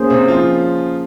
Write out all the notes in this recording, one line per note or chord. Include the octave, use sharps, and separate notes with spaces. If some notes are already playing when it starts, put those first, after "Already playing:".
Already playing: A#3 C#4 G#4 C5
C3 C4
F3 F4